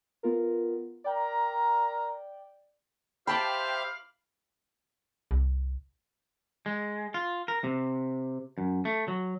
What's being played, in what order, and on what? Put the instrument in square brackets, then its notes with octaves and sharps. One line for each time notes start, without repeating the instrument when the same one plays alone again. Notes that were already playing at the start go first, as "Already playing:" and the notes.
[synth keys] B3 F4 A#4
[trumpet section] A#4 A#5 [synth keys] D5 G5
[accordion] G4 C5 E5 [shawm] F5 [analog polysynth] G5 A5 [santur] B5 D6
[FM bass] C2
[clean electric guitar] G#3
F4
A#4
C3
F#2
A3
F#3